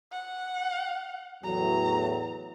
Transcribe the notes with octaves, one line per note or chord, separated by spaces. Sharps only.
F#5
E2 A2 F#3 A#5